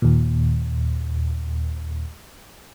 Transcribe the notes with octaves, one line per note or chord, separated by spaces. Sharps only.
D#2 A#2